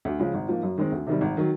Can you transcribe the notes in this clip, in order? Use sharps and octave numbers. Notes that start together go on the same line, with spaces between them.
D2
C#3 F3 G#3
G#1
G#2 F3 A#3
F#2
D#3 G#3 C4
D2
C3 D#3 G3
G#1
D#3 F#3